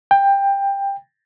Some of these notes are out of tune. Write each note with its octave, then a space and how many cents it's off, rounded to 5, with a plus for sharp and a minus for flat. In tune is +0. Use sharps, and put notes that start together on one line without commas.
G5 +15